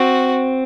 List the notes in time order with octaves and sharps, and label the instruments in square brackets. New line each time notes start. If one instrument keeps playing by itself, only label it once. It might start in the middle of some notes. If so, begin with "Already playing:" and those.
Already playing: [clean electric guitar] C4 [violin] F#4